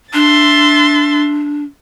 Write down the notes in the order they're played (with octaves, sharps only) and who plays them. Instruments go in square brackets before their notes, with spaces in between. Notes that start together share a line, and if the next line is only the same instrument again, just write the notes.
[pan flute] D4 [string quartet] E5 C6 A6